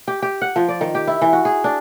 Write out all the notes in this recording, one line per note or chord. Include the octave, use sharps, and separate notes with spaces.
G4
G4
F#5
F3
D5
D#3
G4
E4
E3
F#4
G#4
D4